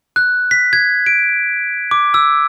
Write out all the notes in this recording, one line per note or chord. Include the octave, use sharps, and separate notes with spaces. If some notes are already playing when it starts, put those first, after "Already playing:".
F#6
B6
G#6
D7
D6
E6